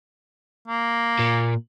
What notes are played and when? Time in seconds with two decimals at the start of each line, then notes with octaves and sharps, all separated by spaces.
0.68 A#3
1.19 A#2